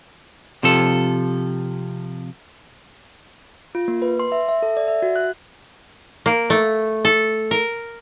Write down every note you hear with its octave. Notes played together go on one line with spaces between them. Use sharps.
C3 F3 A4
F4
A#3
B4
C6
E5
E5
A4
D5
E5
F#4
F#6
A#3
A3
A4
A#4